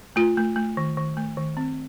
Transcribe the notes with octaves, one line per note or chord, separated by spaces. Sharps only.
A3 F4
A3
A3
D#3
D#3
A3
D#3
C4